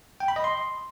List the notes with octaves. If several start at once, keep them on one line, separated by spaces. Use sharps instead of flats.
G5
B5
D#5
C6